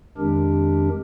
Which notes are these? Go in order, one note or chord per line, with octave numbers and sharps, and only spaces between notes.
F2 D#3 G#3 D4 G4 A#4